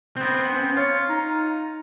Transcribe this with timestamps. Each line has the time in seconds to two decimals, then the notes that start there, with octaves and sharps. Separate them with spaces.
0.17 B3 C4
0.52 C#4
0.77 F4 C#5
1.09 D#4